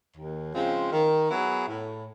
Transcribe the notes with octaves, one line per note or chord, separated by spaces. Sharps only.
D#2
C#3 F3 G#3 C4
D#3
F#3 B3 E4 G#4
A2